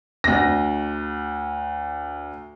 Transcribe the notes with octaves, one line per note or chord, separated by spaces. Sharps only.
D2 A#6